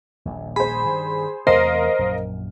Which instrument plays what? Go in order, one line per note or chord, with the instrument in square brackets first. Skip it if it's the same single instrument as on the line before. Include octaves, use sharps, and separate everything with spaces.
[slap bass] D#1 A#1
[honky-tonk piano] G#4 C5 [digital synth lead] B5
[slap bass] G2 D#3
[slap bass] E2 C3 A3 [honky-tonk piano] A#4 D#5 F5 [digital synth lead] C5
[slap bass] A#1 F#2